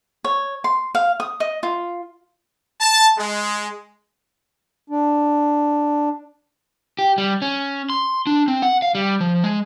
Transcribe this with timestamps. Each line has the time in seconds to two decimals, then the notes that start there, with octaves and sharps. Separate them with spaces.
0.24 C#5
0.64 C6
0.95 F5
1.20 D#6
1.40 D#5
1.63 F4
2.81 A5
3.18 G#3
4.90 D4
6.99 G4
7.18 G3
7.42 C#4
7.90 C6
8.27 D4
8.48 C4
8.62 F#5
8.82 F5
8.95 G3
9.20 F3
9.44 G#3